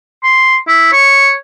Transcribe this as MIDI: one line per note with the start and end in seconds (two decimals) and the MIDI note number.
0.23 0.57 84
0.68 0.90 64
0.92 1.34 73